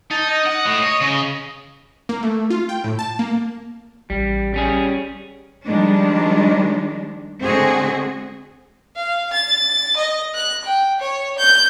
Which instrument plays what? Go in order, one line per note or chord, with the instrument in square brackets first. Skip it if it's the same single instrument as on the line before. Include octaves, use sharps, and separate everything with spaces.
[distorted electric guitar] D#4 [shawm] A5
[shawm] D#5
[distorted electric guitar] F#5
A2
C#5
C#3
[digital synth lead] A#3
A3
F4
G5
A2
A5
A#3
[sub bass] A1 [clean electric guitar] G3
[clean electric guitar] G3 C#4 G#4
[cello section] D#3 F3 G3 G#3 D4
D3 G#3 C4 F#4 G#4
[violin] F5
A6
D#5
F#6
G5
C#5
G6